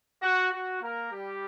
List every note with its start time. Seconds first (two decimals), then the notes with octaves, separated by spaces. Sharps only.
0.23 F#4
0.52 F#4
0.82 A#3 A#4
1.12 G3 G4